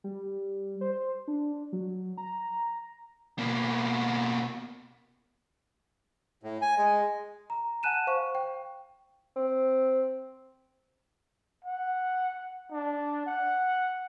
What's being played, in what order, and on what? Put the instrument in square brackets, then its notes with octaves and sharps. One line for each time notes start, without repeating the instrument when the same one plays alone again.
[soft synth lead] G3
C5
D4
F#3
A#5
[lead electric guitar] B2 A#3
[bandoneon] A2
G#5
G#3
[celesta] A#5
F#5 G#5 A5 F#6 D#7 E7
C5 F5 C#6
G5
[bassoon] C4
[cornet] F#5
D4
F#5